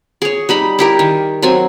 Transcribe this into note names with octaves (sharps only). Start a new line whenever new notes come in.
G#4 C#5
G3 D#4 B5
E4 G4 A#4
D#3
F#3 C4 G#5